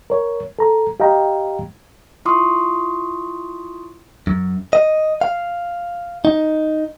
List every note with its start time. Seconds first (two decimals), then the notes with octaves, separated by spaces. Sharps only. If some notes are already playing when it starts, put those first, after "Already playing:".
0.10 A#4 C#5
0.59 A4 A#5
1.00 G4 D#5 F5 G5 A#5
2.25 E4 F4 C6 C#6 D#6
4.27 F#2
4.73 D#5
5.21 F5
6.25 D#4